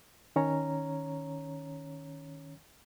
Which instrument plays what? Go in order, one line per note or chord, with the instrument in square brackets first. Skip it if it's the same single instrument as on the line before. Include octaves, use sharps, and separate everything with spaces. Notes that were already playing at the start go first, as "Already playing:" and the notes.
[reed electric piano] D#3 C#4 C#5 A#5